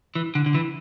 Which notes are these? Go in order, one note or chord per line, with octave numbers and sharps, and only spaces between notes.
E3
D3
D3
E3